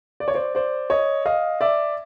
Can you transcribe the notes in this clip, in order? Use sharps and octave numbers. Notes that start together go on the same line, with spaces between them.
D5
C#5
C5 D5
C5 D5
C#5 D#5
D#5 F5
D5 E5